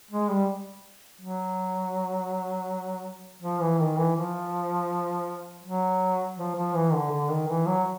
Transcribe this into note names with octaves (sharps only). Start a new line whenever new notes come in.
G#3
G3
F#3
F3
E3
D#3
E3
F3
F#3
F3
F3
E3
D3
D3
D#3
E3
F#3